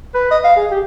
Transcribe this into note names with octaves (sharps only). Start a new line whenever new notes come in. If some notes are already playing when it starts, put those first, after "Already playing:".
B4
D#5
F5
G#4
G4